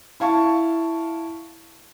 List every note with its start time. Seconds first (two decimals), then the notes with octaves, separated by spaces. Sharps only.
0.20 E4 F5 A5 C#6